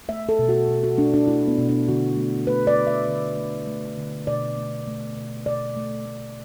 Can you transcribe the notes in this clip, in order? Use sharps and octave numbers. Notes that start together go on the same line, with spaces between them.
A3 E5
A4
B2
F#4
B2
F#4
A3 D4
D4
A3 E4
B3
B2
D4
D3 F#4
A3
A3 B4
D5
D3
E5
D3
A3
A3
D3
B2 D5
A3
A3
B2
B2 D5
A3
A3